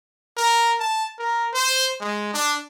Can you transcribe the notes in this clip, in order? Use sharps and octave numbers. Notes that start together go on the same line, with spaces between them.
A#4
A5
A#4
C5
G#3
D4